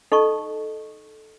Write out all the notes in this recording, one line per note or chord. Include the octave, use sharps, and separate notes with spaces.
D#4 A4 D#5 A5 C#6